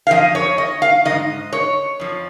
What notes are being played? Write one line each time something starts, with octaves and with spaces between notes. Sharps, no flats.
F5
F2 F3 D#5
C#5
D#5
F5
G#2 D#3 D#5
C#5
F2 F3